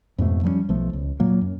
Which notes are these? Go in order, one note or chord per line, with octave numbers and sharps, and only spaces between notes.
F2 G#2 B2 A3
F3 G3 A#3 C#4
B1 F3 A3
C#2
A#2 F#3 A#3
F#2